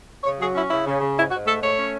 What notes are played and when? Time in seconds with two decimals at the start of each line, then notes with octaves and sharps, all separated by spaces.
0.24 C#3 C#5
0.40 F#3 G#4
0.54 C#4 E4
0.70 C#3 E4
0.86 C#3
1.00 C#3
1.16 G#2 E4
1.31 G#2 F#4
1.46 A3 A4
1.62 A3 C#5
1.77 C#4